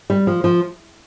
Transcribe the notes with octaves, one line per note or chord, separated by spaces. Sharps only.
G3
F3
F3